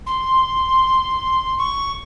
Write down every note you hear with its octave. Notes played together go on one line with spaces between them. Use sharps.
C6
C#6